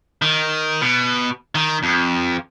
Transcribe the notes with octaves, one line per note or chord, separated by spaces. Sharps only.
D#3
B2
D#3
F2